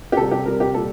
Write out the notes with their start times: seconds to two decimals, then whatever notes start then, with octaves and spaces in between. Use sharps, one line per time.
0.12 G4
0.17 C3 G3 A4
0.31 G4
0.45 C3 G3 A#4
0.60 G4
0.74 A#2 G3 A4